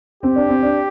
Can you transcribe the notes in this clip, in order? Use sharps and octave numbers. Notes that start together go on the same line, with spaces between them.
C4 G4
D4
C4
D4